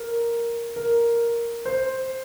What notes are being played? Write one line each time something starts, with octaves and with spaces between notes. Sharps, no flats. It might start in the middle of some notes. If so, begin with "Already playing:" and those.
Already playing: A#4
A#4
C5